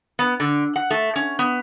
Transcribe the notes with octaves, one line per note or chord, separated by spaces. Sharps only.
B3
D3
F#5
A3
C#4
B3